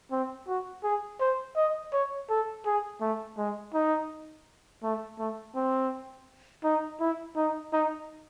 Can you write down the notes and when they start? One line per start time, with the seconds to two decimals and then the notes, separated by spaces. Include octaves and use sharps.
0.12 C4
0.48 F#4
0.84 G#4
1.20 C5
1.56 D#5
1.93 C#5
2.30 A4
2.66 G#4
3.01 A3
3.38 G#3
3.74 D#4
4.83 A3
5.19 A3
5.55 C4
6.64 D#4
7.00 E4
7.36 D#4
7.73 D#4